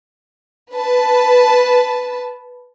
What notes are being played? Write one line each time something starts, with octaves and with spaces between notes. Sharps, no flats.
B4 A5